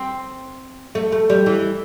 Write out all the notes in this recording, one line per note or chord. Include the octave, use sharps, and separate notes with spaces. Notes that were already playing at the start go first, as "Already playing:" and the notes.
Already playing: C4
A3
A3
G3
E3